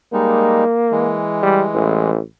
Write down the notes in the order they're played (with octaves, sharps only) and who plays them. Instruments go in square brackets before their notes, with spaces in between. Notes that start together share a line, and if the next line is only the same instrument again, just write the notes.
[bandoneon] G3 G#3 D#4 [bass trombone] A#3
[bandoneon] E3 G#3
[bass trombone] G3
A1